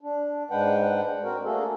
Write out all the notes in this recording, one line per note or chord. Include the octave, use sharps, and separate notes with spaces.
D4
G#2 G#3 D4 B4 F#5 G5
C4 F#4 A#4
A3 A#3 D4 F#4 G#4 A4